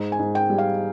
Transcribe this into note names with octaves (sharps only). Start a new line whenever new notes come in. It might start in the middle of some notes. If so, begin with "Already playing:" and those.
Already playing: G#2
G#5
G#2
G5
G3
F5